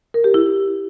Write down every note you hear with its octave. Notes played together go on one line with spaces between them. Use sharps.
A#4
G4
E4